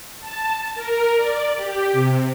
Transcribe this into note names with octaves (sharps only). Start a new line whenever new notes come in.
A5
A#4
D5
G4
C3